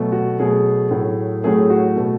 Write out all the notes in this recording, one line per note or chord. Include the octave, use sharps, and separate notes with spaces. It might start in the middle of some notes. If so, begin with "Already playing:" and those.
Already playing: B2 F#3 A3
F#4
B2 F#3 A3 G#4
A2 F#3 A3
A2 F#3 A3 G#4
F#4
B2 A3